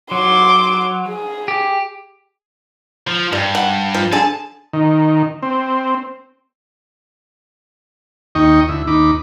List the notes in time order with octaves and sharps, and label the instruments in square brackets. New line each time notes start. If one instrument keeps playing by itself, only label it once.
[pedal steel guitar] F#3 [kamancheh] C6 D6
[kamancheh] G#4
[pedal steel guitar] G4
[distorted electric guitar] F3
[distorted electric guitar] G2 [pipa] G3
[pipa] F#5
F3
[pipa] D3 G#4 [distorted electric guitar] A5
[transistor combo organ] D#3
C4
D#2 D#4 D#5 G5 C#6
D2 E4
D#2 D#4 B5 D6